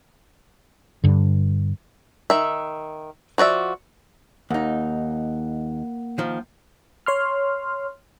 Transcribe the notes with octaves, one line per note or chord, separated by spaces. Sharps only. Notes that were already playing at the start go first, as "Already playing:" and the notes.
G2 D3
D#3 E5
F3 F#4 D5 E5
D#2 A#3 D#4 F#5
D#3 F3
C#5 C6 F6